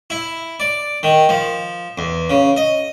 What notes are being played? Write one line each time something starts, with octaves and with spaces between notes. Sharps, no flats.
E4
D5
D#3
F3
E2
C#3
D#5